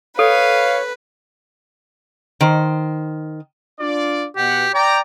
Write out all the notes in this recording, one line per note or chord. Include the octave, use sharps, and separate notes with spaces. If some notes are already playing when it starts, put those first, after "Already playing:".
A4 B4 C#5 F5
D#3 C5
D4 F4 D5
B2 G4 F#5
D5 G5 A#5